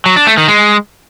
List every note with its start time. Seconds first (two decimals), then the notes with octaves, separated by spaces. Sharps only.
0.06 F#3
0.16 D4
0.27 A3
0.37 D#3
0.48 G#3